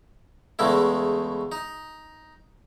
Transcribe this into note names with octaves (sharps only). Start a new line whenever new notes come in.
E2 C#3 G#3 A3 E4
D#4